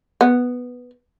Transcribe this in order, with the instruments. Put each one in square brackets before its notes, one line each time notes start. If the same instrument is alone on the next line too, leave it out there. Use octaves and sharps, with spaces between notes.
[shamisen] B3